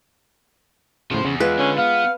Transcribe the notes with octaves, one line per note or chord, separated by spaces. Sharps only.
A2 C#3 F3 C5
E2 C#3
G#3 F4 B4
D3 C#4
B3 F5